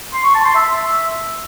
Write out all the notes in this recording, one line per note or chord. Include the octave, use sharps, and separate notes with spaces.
C6
C#6
A5
C6
E5